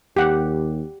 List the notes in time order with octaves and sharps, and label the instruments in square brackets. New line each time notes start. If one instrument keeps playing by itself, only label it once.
[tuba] D#2 [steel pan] G4 F#5